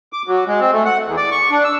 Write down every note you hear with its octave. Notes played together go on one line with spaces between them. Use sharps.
D6
F#3
G#3
C4
A3
F#5
E2
D5
C#6
D4
E6